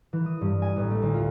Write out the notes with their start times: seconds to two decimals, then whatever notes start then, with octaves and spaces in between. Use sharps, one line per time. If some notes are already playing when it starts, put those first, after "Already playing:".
0.13 E3
0.26 D#6
0.41 G2
0.62 G#5
0.76 A1
0.91 A3
1.02 D2
1.14 F4